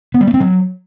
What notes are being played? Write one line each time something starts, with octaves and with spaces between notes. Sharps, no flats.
B3
G3
A#3
C4
F#3